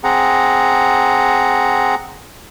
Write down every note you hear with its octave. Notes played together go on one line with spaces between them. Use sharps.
C4 G#4 F#5 A#5